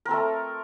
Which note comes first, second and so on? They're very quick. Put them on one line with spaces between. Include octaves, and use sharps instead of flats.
A#4 C4 A4 A3